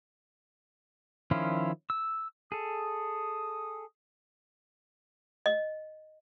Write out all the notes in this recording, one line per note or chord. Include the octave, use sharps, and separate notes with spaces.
D#3 F3 C#4 E4 F4
E6
G#4 A4 D#6
D#5